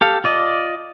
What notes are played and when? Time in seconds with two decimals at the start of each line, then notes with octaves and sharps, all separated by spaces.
0.01 G4 A4 F5
0.24 F4 D5 D#5